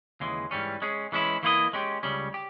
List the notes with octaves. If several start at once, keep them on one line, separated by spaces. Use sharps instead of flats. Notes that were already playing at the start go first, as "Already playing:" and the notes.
D#2 C#3 E3 G#3
G#2 E3 G3 C#4
G#3 C#4 G#4
E3 G#3 C#4 E4
E3 A#3 E4 A#4 D#5
G#3 C#4 G4
C#2 C#3 G3 C#4
G4